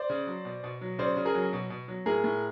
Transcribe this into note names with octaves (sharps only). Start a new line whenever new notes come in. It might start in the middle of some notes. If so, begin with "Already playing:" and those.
Already playing: C5 D5
C#3
F#3
B2
B2
F#3
C#3 C5 D5
C#3
G#4 A#4
F#3
B2
B2
F#3
A2 G#4 A#4
A2